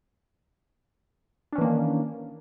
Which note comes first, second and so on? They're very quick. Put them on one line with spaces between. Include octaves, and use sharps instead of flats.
D4 C#4 E3 A#3 D#3